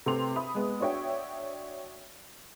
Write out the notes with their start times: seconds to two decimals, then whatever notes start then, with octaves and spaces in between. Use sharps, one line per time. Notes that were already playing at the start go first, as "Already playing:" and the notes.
0.06 C3 A3 G4 B4 C6 F7
0.36 E5 B5 D#6
0.55 G#3 B3
0.80 D4 F#4 C#5 E5 G5